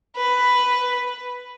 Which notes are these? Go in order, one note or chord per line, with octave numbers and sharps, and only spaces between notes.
B4